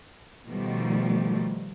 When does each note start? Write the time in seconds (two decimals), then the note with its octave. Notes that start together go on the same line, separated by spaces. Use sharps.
0.46 B2 D#3 F3 G3 A3